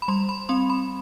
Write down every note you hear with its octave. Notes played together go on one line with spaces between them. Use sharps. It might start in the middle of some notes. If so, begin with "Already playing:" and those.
B5
G3 C6
B5
C4 C6
B5